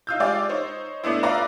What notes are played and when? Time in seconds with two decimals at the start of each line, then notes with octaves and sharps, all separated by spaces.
0.07 D#4 F4 E6 G6
0.20 G#3 F4 G4 D5
0.49 D#4 C5 C#5
1.04 A3 B3 D4 E4
1.23 F4 B4 D5 E5 A#5